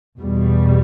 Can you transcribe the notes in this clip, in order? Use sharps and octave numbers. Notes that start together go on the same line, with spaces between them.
E2 B2 G3